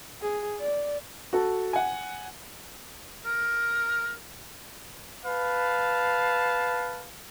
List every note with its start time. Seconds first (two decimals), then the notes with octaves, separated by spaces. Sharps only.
0.22 G#4
0.60 D5
1.33 F#4 A4
1.73 F#5 G#5
3.26 A#4
5.25 B4 F5 A5